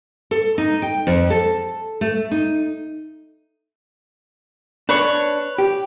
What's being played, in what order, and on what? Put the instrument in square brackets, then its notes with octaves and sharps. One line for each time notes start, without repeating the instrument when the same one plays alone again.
[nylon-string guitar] A4
D#4
G5
F2
A4
A3
D#4
[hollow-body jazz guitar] D4 [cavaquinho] B4 C#5
[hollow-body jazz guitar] G4